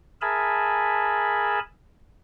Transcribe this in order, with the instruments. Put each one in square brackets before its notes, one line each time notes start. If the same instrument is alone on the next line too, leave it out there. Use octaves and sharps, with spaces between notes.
[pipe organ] G#4 A#4 E5 G#5 A5 B5